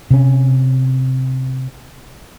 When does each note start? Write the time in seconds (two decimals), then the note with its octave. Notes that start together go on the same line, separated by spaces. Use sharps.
0.11 C3 C#4